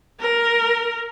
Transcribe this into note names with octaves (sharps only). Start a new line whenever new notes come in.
A#4